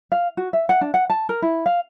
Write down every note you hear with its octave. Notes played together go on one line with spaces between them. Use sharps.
F5
F#4
E5
F#5
D4
F#5
A5
A#4
E4
F5